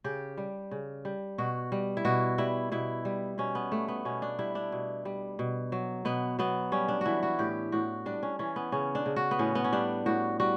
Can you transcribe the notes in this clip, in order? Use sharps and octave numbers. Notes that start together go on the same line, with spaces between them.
C#3 G4
G3
C#3
G3
B2 F#4
G3
E4
B2 F#4
G3 E4
B2 E4
G3
B2 C#4
B3
G3 A3
B3
B2 C#4
D4
G3 E4
D4
B2
G3
B2
F#3
B2 B3
F#3 B3
G3 C#4
D4
E3 E4 F#4
F#4
A2 G4
A2 F#4
G3 D4
C#4
E3 C#4
B3
C#3 C#4
D4
C#3
F#4
B3
A2 C#4
B3
C#4
G3 D4
A2 F#4
G3 F#4